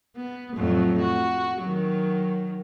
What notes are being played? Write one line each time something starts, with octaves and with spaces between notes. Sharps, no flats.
B3
F2 A2 F#3
F#4
D#3 F#3